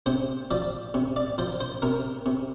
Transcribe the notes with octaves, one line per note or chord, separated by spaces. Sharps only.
C3 C5
F3 D5
C3
D5
F3 C5
C5
C3 A#4
C3